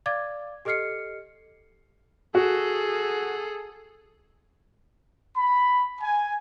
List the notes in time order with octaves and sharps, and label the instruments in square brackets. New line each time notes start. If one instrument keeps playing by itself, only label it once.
[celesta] D5 F5 D6 G#6 A6
G4 A4 D#5 F6 C7 C#7
[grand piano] F#4 [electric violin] G#4 A4
[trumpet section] B5
G#5